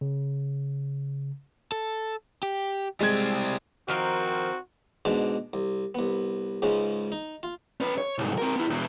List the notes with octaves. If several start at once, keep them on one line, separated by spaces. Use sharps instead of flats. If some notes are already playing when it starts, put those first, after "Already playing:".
C#3
A4
G4
G3 G#3 C4 G#6
D#3 F3 C4 F#4 A#4
G#2 B2 G#3 D4 D6
C2
C2 B3
C#2 G#2 C#3 G#3 C#4
D#4
F4
C#4 B4
C#5
C2 G#2
C4 A#4
B3 E4
E2 B2